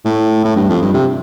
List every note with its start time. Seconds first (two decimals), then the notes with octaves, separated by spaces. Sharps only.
0.05 A2
0.45 A2
0.56 G2
0.70 F2
0.82 G2
0.94 C3